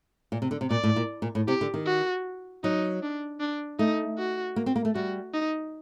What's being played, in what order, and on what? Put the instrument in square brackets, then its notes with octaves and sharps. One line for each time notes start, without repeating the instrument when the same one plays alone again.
[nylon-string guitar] A#2
C3
D3
C3
[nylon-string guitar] A#2 [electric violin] D5
[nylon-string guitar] A2
A#2
A#2
A2
[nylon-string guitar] C3 [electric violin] G4
[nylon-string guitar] D3
D#3
[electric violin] F#4
[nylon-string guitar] F#3 [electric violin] D#4
[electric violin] D4
D4
[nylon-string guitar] A3 [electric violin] D#4
[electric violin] F#4
[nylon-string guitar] A#3
C4
A#3
A3
[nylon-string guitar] G3 [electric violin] F#4
[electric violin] D#4